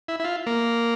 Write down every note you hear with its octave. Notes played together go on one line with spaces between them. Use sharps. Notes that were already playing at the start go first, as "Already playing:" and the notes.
E4
E4
F4
A#3